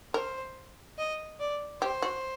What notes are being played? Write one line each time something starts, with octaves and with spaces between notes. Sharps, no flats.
A#4 C5
D#5
D5
G4 C5
F#4